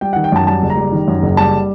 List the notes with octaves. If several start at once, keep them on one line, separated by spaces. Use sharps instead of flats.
G3 G5
D#3 F#5
G5
F#2 A5
G3 A5
F#1
A#5
G3
D#3
F#2
F#1
G3 A5